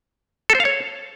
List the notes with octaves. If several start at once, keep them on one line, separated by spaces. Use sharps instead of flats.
A4
C5
F5
C#5